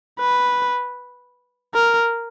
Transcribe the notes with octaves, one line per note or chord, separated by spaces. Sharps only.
B4
A#4